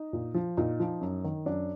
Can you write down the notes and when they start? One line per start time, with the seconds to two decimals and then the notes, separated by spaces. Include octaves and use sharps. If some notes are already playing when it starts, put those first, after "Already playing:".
Already playing: D#4
0.13 A#2
0.34 F3
0.57 A#2 D#4
0.80 F3
1.01 F#2
1.24 D#3
1.46 F#2 D4